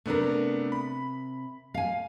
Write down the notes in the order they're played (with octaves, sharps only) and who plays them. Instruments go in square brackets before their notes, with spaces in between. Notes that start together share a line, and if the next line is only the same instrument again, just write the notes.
[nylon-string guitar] C3 A#4 [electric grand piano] A3 B3 D4
[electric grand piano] B5
[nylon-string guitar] F5 G#5